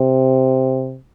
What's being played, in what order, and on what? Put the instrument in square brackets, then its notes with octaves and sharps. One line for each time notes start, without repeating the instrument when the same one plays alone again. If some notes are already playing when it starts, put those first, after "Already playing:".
Already playing: [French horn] C3